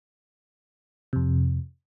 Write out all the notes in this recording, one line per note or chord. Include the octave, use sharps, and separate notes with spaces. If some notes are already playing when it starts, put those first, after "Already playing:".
F2 C3